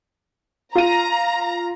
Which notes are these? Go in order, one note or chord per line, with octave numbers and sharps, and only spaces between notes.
F4 A#5 D#7